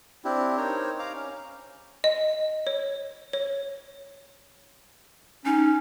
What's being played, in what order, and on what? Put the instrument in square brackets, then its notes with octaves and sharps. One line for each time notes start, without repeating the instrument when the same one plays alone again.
[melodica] C4 D4 E4 G4
D#4 A#4 C5 C#5
F5 A#5 D6
C#4
[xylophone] D#5
C#5
C#5
[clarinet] C#4 [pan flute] D#4